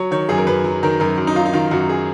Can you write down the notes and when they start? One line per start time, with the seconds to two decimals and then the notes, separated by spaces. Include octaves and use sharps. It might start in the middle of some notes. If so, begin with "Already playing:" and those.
Already playing: F#3 C#5
0.11 D#3 C#5
0.29 F#2 G#4
0.38 A#4
0.47 F#2 B4
0.64 F#3
0.83 D#3 A#4
1.00 F#2 A#4
1.18 F#2
1.27 D#4
1.35 F#3 F4
1.45 D#4
1.53 D#3 F4
1.71 F#2 F#4
1.89 G#4